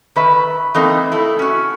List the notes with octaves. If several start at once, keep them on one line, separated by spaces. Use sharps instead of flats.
D#3 B4 E5
E3 A3 A#3 C4 D#4
A3 E4
C#4 F#4